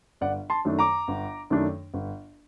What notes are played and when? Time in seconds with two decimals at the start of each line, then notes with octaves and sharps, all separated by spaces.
0.21 G1 D5 F#5
0.50 A5 C6
0.65 F#2 D#3 A3 D4
0.79 A#5 D6
1.08 G1
1.50 F#2 D#3 A3 D4
1.94 G1